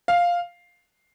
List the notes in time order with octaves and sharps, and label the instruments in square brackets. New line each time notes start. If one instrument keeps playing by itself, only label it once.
[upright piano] F5